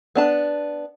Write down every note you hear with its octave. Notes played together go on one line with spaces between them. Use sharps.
B3 D4 A5